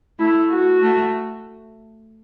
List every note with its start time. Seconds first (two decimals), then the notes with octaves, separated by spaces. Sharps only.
0.19 A3 E4
0.50 F#4
0.82 A3